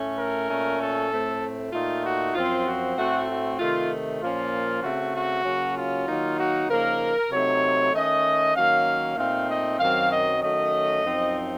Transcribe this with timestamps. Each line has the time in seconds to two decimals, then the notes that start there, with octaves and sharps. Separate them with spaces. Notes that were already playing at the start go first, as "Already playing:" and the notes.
Already playing: A2 A3 C#4
0.18 A#4
0.49 A#2 A3 C#4
0.81 A4
1.11 A2 A3 C4
1.73 A#2 A3 D#4 F4
2.04 F#4
2.35 F#2 F3 C4 F4
2.66 F#4
2.97 A2 A3 C4 F#4
3.29 F#4
3.59 C3 D#3 A3 F4
4.21 A#2 F3 A#3 C#4 F4
4.83 C#3 A3 C4 F#4
5.14 F#4
5.45 C#3 F#3 A#3 C#4
5.76 F4
6.07 D#3 F#3 A#3 D#4
6.38 F#4
6.69 C#3 F3 A#3 D#4 A#4
7.31 C3 F#3 A3 C4 D#4 C#5
7.93 D#3 A3 C#4 D#5
8.55 D#3 F#3 A#3 C#4 F5
9.17 A#2 A3 C4 D#4 F5
9.49 D#5
9.79 F#2 D#3 F#3 C4 F5
10.11 D#5
10.41 D#3 F#3 A3 C#4 D#5
11.04 F#2 F3 C4 D#4